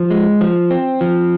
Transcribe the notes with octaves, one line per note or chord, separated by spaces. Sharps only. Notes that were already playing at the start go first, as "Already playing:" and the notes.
Already playing: F3
G#3
F3
C4
F3